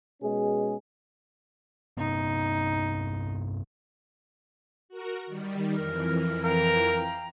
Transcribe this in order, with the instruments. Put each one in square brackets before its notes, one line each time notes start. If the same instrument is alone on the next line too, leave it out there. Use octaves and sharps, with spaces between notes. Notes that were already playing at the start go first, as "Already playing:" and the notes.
[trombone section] B2 G#3 C#4 G#4
[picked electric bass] G2 C3 B3 [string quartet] D#4
[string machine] F#4 A#4
D#3 G3
[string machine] F2 E3 [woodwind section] A#4 F6
[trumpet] A#4 [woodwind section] F5 G5 A#5